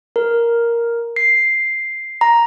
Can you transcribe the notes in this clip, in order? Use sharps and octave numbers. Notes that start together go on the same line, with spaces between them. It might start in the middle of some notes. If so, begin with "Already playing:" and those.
A#4
C7
A#5